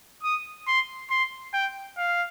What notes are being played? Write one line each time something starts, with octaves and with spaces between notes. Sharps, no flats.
D#6
C6
C6
G5
F5